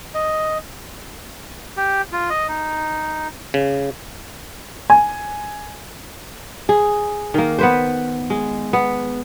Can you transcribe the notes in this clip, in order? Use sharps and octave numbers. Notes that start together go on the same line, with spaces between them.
D#5
G4
F4
D#5
D#4
C#3
G#5
G#4
D#3 A#3
B3 B4 C5
G#3
B3